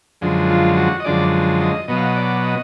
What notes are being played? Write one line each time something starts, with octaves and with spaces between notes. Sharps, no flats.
F#2 D3 F3 G#3
F4
F#4
D#5
F#2 D3 F3 G#3 D5
D#5
B2 F#3 B3 D#5
F5
D#5
D5
D#5